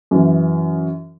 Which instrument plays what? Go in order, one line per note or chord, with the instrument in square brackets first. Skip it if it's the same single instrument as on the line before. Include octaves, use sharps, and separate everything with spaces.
[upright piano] F#2 E3